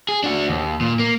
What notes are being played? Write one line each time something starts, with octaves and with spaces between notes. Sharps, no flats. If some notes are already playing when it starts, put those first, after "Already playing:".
G#4
D4 F#4
D#2
A#2
A#3